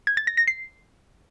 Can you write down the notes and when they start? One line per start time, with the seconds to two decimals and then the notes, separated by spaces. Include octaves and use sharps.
0.07 G#6
0.17 A6
0.27 A#6
0.37 A#6
0.47 C7